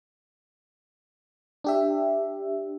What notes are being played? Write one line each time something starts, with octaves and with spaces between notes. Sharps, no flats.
D4 G4 E5